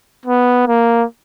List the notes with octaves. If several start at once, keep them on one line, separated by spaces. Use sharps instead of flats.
B3
A#3